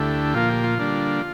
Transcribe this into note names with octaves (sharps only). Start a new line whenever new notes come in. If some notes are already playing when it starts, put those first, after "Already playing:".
Already playing: D2 D3 A3 E4 G4
A#2 F3 A#3 F4
G4
F4
D3 G3 A#3 D4